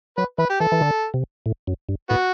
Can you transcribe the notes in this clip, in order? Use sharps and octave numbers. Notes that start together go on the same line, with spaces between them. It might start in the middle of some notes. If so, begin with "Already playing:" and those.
F#3 B4
E3 B4
G4
E3 A4
E3
D3
C3
A2
F#2
G2
A2 B3 F#4